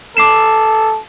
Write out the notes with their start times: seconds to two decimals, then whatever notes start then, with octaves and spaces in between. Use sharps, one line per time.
0.17 A4 D6 C7 E7